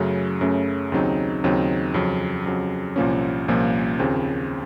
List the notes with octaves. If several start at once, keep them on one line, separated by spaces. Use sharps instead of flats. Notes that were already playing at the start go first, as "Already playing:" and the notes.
Already playing: F#2 C#3 F#3 A3 C#4
F#2 C#3 F#3 A3 C#4
D#2 C#3 F#3 C4 D#4
D#2 C#3 F#3 C4 D#4
F2 C#3 F#3
F2 C#3 F#3
C2 A#2 F3 A#3 C#4
C2 A#2 F3 A#3 C#4
D#2 C#3 F3 C4